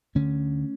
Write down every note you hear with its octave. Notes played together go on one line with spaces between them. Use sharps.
D2 D3 A3 C#4